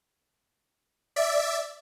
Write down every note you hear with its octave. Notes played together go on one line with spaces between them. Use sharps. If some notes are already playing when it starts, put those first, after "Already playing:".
D5 E5